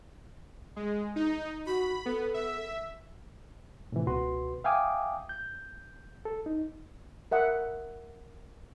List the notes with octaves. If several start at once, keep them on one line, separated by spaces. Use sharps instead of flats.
G#3
D#4
F#4 B5
B3 A4
E5
A2 C3 E3
C#2 B2 F#4 B4 C6
E5 F5 G5 G#5 D6 D#6
G6
A4
D#4
A#4 E5 F#5 D#6